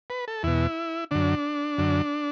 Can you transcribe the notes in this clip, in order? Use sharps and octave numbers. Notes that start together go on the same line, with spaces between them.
B4
A4
E2 B2 E4
F#2 D3 D4
F#2 D3